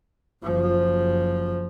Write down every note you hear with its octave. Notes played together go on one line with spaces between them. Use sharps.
F#1 F3